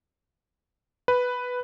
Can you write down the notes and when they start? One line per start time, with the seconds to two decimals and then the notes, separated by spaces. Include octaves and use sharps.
1.08 B4